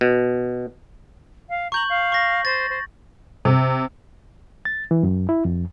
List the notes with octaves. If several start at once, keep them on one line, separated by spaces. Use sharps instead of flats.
B2
F5
A#5 C#6 G6 F#7
F5
C#6 A#6
C5 A6
C5
C3
A6
E3
F#2
E4
F2